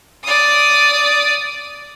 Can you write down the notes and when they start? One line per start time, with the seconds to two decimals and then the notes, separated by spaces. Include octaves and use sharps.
0.24 D5 D#6